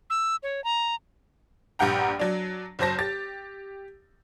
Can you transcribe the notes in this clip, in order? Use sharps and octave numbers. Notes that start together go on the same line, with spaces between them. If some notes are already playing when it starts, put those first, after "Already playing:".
E6
C#5
A#5
A#1 G2 G4 F#5 G5 A#5
F#3 D4
F#1 F#3 C5 A5 A#6
G4 A6